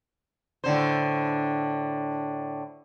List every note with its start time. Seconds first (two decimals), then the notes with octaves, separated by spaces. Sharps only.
0.64 A2 D3 C5